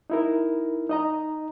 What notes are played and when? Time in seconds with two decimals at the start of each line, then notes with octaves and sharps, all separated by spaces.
0.10 D#4 E4 A#4
0.90 D#4 D#5 A#5